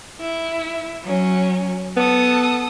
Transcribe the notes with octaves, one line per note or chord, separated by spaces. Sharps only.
E4
F#3 C#4
B3 A4 D#6